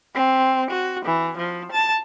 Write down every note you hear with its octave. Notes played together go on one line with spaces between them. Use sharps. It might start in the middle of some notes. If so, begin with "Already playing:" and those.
C4
F#4
E3
F3
A5